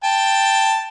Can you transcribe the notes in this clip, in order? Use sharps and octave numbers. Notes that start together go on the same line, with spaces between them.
G5 A5